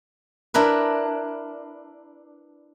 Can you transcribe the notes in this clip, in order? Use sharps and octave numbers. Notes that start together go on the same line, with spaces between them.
D4 E4 A#4 B4